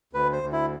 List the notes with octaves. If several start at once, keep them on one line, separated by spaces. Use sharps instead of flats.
D2 B4
C5
D2
E4